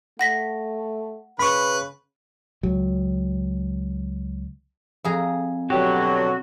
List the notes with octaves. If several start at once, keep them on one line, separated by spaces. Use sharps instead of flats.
A3 F#5 A#6 B6
C#3 B4 B5 C#6
C#2 F#3
F2 G#4 A#5
B2 D3 F#3 F#4 G4